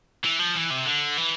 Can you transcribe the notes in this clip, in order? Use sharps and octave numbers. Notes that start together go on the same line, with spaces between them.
E3
F3
E3
C3
D3
E3